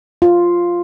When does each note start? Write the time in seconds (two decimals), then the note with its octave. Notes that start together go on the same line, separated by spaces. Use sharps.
0.22 F4